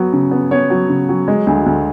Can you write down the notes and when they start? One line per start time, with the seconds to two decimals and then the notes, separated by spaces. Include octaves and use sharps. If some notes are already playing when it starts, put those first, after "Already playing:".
Already playing: F#3 B3 F#5
0.13 C#3
0.31 B3
0.51 B3 C#5
0.70 F#3
0.89 C#3
1.09 F#3
1.28 G#3
1.47 D2
1.66 D2